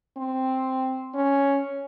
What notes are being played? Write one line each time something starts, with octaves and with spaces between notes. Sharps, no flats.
C4
C#4